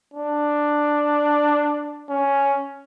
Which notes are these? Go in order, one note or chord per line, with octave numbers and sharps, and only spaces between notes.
D4
C#4